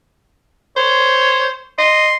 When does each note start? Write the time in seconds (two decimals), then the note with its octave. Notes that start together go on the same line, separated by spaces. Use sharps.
0.77 C5 C#5
1.79 D#5 C6